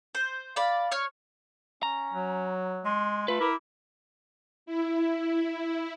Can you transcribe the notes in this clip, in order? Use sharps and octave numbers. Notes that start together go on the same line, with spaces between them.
C5
D5 F5 B5
C#5 F6
C#4 A#5
F#3
G#3 C6
A3 F4 B4 B5
E4 A#4 D6
E4